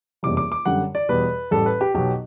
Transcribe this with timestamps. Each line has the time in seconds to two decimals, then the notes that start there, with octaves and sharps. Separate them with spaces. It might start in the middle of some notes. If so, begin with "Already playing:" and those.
0.23 F#1 E2 C3 G3 D6
0.37 D6
0.52 D6
0.65 F#2 D3 G3 F#5
0.95 D5
1.09 E2 B2 G3 B4
1.51 A1 A2 G3 A4
1.66 B4
1.81 G4
1.94 B1 B2 F#3 G4